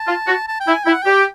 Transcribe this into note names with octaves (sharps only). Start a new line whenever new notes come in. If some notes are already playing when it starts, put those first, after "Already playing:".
Already playing: A5
F4
F#4
A5
G5
E4
G#5
E4 G5
F#5
G4 G5